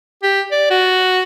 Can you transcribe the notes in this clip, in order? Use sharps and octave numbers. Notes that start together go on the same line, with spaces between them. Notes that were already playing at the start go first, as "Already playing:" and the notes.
G4
D5
F#4